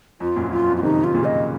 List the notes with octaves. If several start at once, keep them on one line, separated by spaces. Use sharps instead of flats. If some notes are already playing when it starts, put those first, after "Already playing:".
F2 F4
F#2 A#2
F#2 F4
F2
F4
C3 D#3 D#4
F4
A#2 C#3
D#5